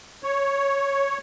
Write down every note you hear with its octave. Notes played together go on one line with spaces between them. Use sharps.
C#5